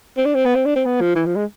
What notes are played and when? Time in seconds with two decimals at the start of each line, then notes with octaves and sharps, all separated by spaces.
0.18 C4
0.25 D4
0.35 C4
0.45 B3
0.55 C4
0.65 D4
0.76 C4
0.86 B3
1.01 F3
1.15 E3
1.26 F3
1.36 G#3